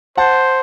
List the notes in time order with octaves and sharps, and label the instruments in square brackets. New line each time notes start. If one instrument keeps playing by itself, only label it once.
[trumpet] C5 [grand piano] F#5 A5